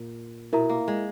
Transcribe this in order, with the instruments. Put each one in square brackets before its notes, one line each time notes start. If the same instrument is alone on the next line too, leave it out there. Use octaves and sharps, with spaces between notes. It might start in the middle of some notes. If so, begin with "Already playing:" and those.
Already playing: [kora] A#2
[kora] B2 [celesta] E4 A#4 E5 A#5
[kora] A#3
G#3